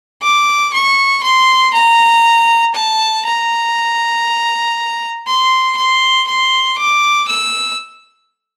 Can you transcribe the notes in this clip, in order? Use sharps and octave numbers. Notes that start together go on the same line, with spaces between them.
D6
C#6
C6
A#5
A5
A#5
C6
C6
C6
D6
E6